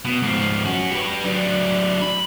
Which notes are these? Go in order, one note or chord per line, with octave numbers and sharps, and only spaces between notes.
B2
G#2 F3
C#4 F#4
G4 B4
F#3 D4
B5